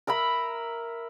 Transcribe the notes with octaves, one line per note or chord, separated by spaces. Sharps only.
A#4 E5 A#5 B5